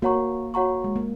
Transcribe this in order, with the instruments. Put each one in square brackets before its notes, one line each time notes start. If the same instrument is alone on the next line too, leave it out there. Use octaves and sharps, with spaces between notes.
[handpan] A#3 [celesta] F#4 C#5 F#5 A#5 C#6
[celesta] F#4 C#5 F#5 A#5 C#6
[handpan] G#3
A#3